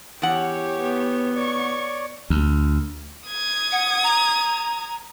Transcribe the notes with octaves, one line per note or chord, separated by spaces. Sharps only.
E2 G4 C#5 F#5
B3
C#5 D5 C#6
D2
D#6 G#6
F#5
A#5